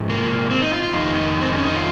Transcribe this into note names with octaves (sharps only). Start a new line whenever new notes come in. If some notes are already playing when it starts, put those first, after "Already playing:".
Already playing: G#2 F3
A#3
C4
D#4
F4
F4
F2 D#3 D#4
D#4
C4
C#4
D#4
F4